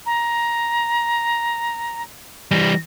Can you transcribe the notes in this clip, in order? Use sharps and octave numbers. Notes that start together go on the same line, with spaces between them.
A#5
E3 G3 A#6